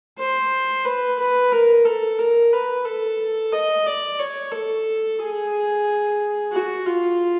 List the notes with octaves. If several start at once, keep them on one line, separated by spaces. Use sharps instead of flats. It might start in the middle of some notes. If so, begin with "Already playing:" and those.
C5
B4
B4
A#4
A4
A#4
B4
A4
D#5
D5
C#5
A4
G#4
F#4
F4